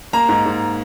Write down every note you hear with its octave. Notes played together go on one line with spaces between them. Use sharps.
A#3 A#5
G#2
G#2